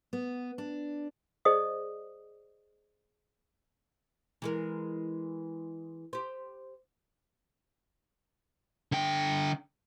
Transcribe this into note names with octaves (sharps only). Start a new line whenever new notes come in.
B3
D4
G#4 C5 D5 D#5 D#6
E3 G#3 A#4
G4 C5
D3 G5